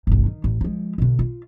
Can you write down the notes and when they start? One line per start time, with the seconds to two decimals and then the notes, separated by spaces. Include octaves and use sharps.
0.07 G1 C2
0.26 D#3
0.44 A1
0.61 F3 G#3
0.98 B2 D3
1.19 F4